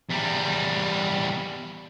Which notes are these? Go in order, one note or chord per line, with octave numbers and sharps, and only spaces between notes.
E2 G3